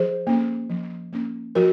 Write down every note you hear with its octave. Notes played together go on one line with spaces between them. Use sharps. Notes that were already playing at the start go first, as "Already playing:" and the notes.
Already playing: F3 G#4 C5
A#3 C#4
F3
A#3 C#4
F3 F#4 A#4